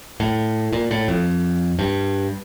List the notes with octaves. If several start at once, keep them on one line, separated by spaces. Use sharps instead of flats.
A2
A#2
A2
F2
G2